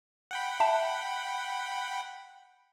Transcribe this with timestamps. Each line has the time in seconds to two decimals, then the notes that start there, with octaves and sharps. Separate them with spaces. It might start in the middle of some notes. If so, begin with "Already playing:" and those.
0.31 F#5 G5 B5
0.60 E5 A5